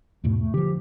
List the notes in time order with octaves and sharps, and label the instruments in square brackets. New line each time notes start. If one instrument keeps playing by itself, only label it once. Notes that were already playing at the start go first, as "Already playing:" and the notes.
[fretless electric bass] E2 G#2 B2 [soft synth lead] A3
[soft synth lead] A3
[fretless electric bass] D3 F3 [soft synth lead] G4